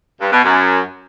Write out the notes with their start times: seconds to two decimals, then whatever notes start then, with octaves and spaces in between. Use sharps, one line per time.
0.21 G2
0.32 B2
0.43 F#2